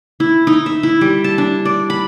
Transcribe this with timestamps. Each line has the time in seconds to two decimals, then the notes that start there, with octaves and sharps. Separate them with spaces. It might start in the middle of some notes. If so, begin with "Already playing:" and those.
0.20 E4
0.47 D#4
0.66 E5
0.83 E4
1.01 G3
1.24 A5
1.38 D4
1.65 D5
1.90 B5